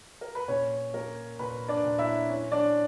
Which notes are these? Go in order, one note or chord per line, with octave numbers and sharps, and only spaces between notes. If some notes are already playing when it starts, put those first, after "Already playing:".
A#4
B4
A#2 C#4 C#5
A#3 A#4
A#2 B4
D4 D5
A#2
E4 E5
C#4
D4 D5